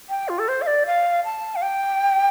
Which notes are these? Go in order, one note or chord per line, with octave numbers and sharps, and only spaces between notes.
G5
F4
A4
C5
F5
D5
F5
A5
F5
G5